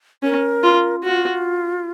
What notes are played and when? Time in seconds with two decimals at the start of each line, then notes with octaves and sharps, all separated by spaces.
0.23 C#4 A#4
0.63 F4
1.03 F4 F#4